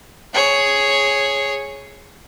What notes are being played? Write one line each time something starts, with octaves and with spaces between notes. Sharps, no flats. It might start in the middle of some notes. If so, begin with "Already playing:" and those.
G#4 C#5